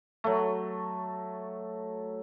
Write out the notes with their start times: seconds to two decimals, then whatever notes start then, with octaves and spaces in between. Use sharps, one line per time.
0.24 F#3 A3